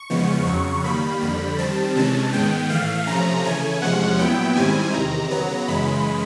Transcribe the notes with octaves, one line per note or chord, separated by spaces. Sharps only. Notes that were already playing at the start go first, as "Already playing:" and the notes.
Already playing: C#6
E2 C#3 F3 G#3 B3
F2 C#3 F#3
D#3 G3 A#3 B5
F2 D3 G3
D#3 G3 C4 A5
C3 E3 G#3 C#4 A5
G#2 D#3 G#3 B3 G5
A2 E3 A3 F5
C3 F3 A3 C#4 A#5
C#3 E3 A3 G#5
E2 C3 F3 G#3 C#4 F#5
A#2 F#3 B3 E4 G5
G#2 D#3 G3 C4 E4 G#5
E2 C3 D#3 A#5
C#3 F#3 B3
F#2 C#3 E3 G#3 B5